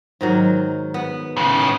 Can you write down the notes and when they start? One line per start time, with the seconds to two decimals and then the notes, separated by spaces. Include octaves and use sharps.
0.21 G#2 D#3 F#3
0.94 B3
1.37 A2 C#3
1.61 G#4